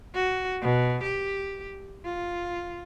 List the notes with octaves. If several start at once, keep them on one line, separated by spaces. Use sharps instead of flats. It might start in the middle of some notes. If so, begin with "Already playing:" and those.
F#4
B2
G4
F4